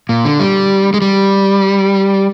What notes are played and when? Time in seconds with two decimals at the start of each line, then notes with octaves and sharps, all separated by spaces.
0.09 A#2
0.25 D3
0.40 G3
0.94 G#3
1.02 G3